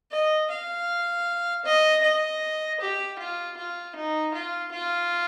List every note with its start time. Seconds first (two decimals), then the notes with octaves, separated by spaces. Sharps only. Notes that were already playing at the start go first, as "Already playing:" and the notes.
0.12 D#5
0.50 F5
1.65 D#5
2.03 D#5
2.80 G4
3.19 F4
3.57 F4
3.95 D#4
4.34 F4
4.71 F4